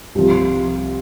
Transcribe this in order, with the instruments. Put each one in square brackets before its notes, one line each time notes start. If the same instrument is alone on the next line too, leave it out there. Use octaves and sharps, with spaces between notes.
[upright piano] C2 C3 F3